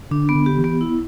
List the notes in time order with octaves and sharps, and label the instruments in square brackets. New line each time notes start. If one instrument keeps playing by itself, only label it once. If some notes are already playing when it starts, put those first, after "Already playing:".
[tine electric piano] D3 [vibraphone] D4
[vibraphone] B3
[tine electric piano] D3
[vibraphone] G4
[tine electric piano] E3
[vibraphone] B3
E4